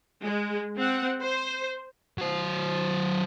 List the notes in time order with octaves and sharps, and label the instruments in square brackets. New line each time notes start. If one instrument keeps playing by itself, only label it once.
[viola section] G#3
C4 F#5
C5
[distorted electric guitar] F#3 C5